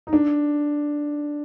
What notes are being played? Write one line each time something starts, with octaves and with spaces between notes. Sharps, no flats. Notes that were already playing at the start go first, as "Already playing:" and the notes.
D#4
D4